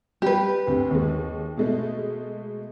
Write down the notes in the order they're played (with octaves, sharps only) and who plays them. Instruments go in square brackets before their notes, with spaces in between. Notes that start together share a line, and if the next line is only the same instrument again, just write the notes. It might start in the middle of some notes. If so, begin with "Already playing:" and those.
[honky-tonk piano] G3 [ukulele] G4 B4
[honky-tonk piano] D2 C4
D#2 G#3
B2 G#3 A3